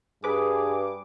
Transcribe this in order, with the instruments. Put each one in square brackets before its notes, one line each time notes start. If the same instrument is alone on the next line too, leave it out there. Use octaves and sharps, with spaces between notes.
[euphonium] G2 [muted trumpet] G#4 [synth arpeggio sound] B4 D6